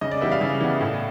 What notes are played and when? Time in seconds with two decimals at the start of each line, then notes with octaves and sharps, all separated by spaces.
0.01 C#3 D#5
0.11 D5
0.21 E3 G3 B3 E5
0.32 F5
0.41 C#3
0.61 E3 G3 B3
0.81 A2